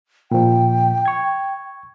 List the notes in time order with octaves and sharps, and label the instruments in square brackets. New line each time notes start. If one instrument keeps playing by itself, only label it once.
[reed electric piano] A#2 F3 [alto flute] G5
[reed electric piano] C#6 G#6